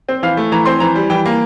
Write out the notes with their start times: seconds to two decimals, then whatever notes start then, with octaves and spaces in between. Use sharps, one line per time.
0.09 C4
0.23 E3 F5
0.37 A3
0.52 E3 A#5
0.65 C4 C6
0.80 E3 A#5
0.95 G3
1.10 E3 G5
1.26 A#3